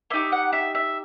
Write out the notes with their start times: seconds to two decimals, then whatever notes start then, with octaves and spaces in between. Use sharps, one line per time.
0.10 A#3 D#4 G4 E5
0.32 F#5
0.53 E5
0.75 E5